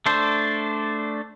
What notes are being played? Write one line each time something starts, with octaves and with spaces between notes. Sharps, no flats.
A3 D4 A4 C5